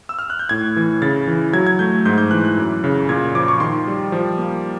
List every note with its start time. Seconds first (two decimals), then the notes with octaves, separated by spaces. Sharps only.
0.09 E6
0.19 F6
0.30 F#6
0.39 G6
0.49 A2 G#6
0.77 E3
1.02 C#3 A6
1.27 E3
1.53 F#3 G#6
1.67 G#6
1.79 A3 G6
2.05 G#2 G6
2.18 G6
2.31 E3 F#6
2.45 F#6
2.58 F#2
2.84 C#3
3.09 A#2 G#6
3.35 F3 D6
3.48 C#6
3.60 D#3 C6
3.87 G3
4.12 F3
4.38 A#3